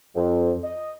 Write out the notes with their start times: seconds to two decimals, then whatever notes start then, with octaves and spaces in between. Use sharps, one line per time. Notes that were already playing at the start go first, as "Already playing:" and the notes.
0.15 F2
0.64 D#5